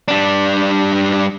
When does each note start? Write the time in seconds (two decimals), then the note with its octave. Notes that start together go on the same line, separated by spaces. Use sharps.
0.08 G3 D4